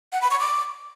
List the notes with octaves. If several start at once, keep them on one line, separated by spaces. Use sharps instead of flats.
F#5
B5
C#6
D6